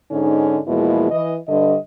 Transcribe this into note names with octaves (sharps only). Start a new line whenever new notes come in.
G#2 D3 C#4 D#4
E2 B2 F3 G#3 A#3 E4
E3 D#5
G2 D3 D#5